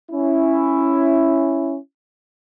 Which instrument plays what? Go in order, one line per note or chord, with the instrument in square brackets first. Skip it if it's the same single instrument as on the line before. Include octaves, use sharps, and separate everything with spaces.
[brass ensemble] C#4 E4